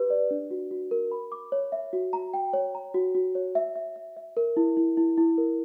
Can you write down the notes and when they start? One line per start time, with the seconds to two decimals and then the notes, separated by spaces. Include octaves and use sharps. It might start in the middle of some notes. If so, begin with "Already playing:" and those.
Already playing: G4 B4
0.10 D5
0.31 D4
0.51 F#4
0.71 F#4
0.91 A#4
1.11 B5
1.32 D6
1.52 C#5
1.72 E5
1.93 F#4
2.13 A#5
2.34 G5
2.53 C#5
2.75 A#5
2.94 F#4
3.15 F#4
3.35 C#5
3.55 E5
3.76 E5
3.96 E5
4.17 E5
4.37 A#4
4.57 E4
4.77 E4
4.97 E4
5.17 E4
5.38 A#4